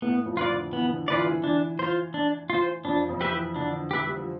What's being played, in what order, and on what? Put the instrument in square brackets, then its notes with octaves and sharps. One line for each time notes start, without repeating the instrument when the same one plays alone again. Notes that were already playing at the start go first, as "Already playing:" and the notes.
[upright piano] A2 A3 [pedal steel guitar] B3
[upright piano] F2 F3
[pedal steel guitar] F4 B4 D5
[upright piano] D3
[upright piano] E3 [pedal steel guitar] B3
[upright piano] D3
[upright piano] E3 [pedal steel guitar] F4 B4 D5
[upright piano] E3
[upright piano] E3 [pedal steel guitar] D4
[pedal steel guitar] F4 C5
D4
F4 C5
[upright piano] F2 F3 [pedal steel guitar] D4
[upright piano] F2 F3
[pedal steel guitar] G4 B4 E5
[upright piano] E3
[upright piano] D3 [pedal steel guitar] D4
[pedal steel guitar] G4 B4 E5
[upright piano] G3
F3